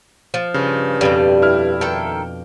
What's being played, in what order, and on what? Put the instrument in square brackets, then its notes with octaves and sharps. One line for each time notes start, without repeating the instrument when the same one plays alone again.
[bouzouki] F3
[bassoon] G2 [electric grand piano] C#3 [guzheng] C6
[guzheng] F2 B2 D4 [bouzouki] G3
[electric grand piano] E4 F6
[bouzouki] D#3 A4 [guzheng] G5